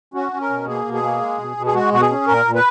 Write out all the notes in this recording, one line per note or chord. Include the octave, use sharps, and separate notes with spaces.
C#4 F#4
C#4
A#4
B2
A#3 G#4
B2
G#4
A#3
G#3
B2
B2
G#4
G#3 F#4
B2 F#4
G#4
C#4
A#2 A#4
A#2
B4